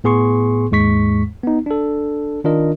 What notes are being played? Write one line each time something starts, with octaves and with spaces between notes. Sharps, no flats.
A2 B3 G#4 C6 C#6
D#2 G#2 G#3 C#6 B6
B3 D#4
D4 A4
D#3 D4 F4 A#4 D#5